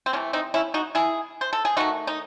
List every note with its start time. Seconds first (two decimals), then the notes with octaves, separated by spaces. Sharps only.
0.06 C4
0.13 C3 E3 A3 C#4
0.33 C4 D#4
0.54 C#4 E4
0.74 D#4 F#4
0.95 E4 G#4
1.41 C5
1.53 A4
1.65 G#4
1.77 D#3 A3 D#4 F#4
2.07 D#4